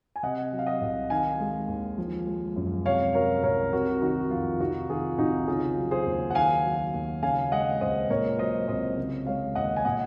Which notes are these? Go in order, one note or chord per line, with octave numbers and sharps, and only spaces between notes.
G#5
C3 D#5 F#5
F#3
F5
D#5 F#5
C2
D#3 F5 G#5
G#3
D#2
F3
G#3
F#2
C3 C#5 F5
F#3 A#4 C#5
C2 A#4 C#5
C3 F#4 A#4
D#3 D#4 F#4
F2 F4
C3 D#4 F#4
D#3 F4 G#4
C2 D#4 F#4
C#3 F4 G#4
F#3
G#4 C5
D#2
F#5
D#3 F5 G#5
F#3
D#2
C#3 F5 G#5
G#3 D#5 F#5
C#2 C5 D#5
A#2 A#4 C#5
F#3 C5 D#5
C2 C5 D#5
C#3
G#3 C#5 F5
D#2 D#5 F#5
G#5
A#2 D#5 F#5